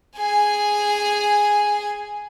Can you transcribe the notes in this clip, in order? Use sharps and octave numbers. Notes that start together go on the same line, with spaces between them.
G#4 G#5